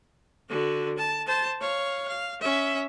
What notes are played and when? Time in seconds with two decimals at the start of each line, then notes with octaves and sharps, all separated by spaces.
0.49 D3 F#4
0.98 A5
1.27 C5 A5
1.61 C#5 F5
2.08 F5
2.41 C#4 E5